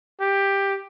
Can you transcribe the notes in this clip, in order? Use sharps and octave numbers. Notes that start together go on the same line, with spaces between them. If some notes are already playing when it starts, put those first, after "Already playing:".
G4